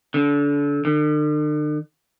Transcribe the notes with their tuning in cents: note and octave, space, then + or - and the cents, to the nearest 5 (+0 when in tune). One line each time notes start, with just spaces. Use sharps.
D3 -30
D3 +45